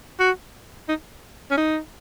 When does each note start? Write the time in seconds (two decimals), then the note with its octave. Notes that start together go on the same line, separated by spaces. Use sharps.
0.20 F#4
0.89 D#4
1.51 C#4
1.58 D#4